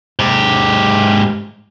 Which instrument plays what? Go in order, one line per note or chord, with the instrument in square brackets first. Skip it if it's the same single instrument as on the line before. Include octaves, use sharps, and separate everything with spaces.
[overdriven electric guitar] G#2 G4